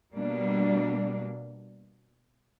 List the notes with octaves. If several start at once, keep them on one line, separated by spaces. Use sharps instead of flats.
B2 G3 A#3 D4